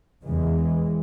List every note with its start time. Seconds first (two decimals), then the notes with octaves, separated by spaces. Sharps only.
0.24 E2 C#3 E3 G#3